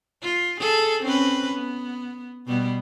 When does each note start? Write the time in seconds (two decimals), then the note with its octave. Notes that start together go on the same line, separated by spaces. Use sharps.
0.22 F4
0.60 G#4 A4
1.03 C4 C#4 B4
1.54 B3
2.47 B2 G3 B3